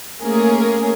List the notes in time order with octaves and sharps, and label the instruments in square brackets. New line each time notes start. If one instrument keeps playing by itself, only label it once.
[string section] A3 A#3 C#4 G#4 A#4